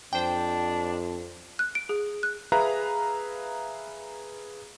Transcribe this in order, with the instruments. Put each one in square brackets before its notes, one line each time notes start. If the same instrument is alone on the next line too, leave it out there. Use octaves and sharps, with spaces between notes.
[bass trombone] F2 [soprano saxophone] D4 [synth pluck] C5 G5
[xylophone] F#6
D7
G#4
F#6
[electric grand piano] G#4 B4 E5 F5 A#5 F#6